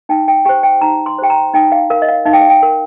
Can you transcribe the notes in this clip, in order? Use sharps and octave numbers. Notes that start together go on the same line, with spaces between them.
D#4 G5
G5
G4 C5 G5
G5
D#4 A#5
C6
G4 C5 G5
A#5
D#4 G5
F5
A#4 F5
D#5
F5
D#4 F5
G5
F5
G5
A#4